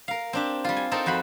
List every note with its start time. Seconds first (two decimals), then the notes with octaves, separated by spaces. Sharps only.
0.08 A#4 F5
0.33 C4 D4 G4
0.64 G3 F4
0.77 G#5
0.91 C4 D#4 A4 A#4
1.06 F2 F#4 C5 B5